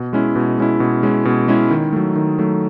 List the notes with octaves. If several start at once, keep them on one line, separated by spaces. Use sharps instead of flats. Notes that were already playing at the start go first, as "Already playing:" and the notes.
Already playing: B2
G#3 C#4 E4
B2
G#3 C#4 E4
B2
G#3 C#4 E4
B2
G#3 C#4 E4
D#3
F#3 A3
D#3
F#3 A3